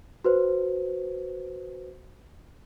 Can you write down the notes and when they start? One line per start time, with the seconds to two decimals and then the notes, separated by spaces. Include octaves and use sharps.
0.25 F#4 B4 C5